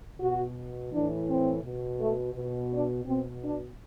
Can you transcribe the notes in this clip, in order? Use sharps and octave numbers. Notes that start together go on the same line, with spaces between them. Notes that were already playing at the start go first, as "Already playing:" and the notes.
B2 F#4
A2 E3 D4
C4
B2
A3
B2
D4
B2 C4
D4